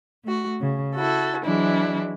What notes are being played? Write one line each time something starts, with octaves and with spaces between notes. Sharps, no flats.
A3 F#4
C#3
E4 F#4 A4
E3 F#3 G#3 D4 E4